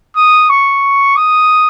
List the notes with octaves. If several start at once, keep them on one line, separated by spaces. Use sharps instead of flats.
D#6
C#6
D#6